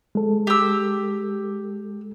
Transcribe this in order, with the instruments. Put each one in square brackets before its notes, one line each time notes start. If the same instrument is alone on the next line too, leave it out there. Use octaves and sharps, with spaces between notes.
[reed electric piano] G#3 A4
[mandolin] G4 E6